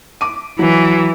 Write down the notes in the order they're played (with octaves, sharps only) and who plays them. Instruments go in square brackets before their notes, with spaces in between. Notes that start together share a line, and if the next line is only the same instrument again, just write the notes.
[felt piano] D6 D#7
[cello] E3 [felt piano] F#3